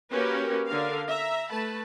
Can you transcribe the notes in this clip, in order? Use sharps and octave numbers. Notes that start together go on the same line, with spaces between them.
A#3 C#4 F#4 G4 A#4 B4
D3 D4 A#4 F5
E5 A#5
A3 B4 A5 B5